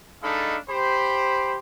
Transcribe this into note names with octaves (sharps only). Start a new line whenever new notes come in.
G#3 D4 D#4 A4 F5 B5
G4 C5 B5